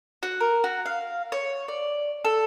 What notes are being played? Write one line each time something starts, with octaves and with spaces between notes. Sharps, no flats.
F#4
A#4
F#4
F5
C#5
D5
A4